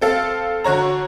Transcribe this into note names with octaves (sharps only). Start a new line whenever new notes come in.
C4 A4 F5
D3 F#4 C#5 A#5